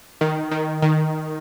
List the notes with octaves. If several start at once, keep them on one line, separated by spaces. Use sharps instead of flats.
D#3
D#3
D#3